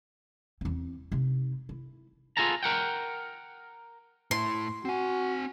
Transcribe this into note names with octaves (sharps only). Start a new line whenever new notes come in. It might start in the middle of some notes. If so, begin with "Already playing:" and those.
E2 C4
C3 D#4
E4
B3 F4 G#4 A4 A5 A#5
A#4 F#5 G5
A2 E4 C6
C4 F#4 G#5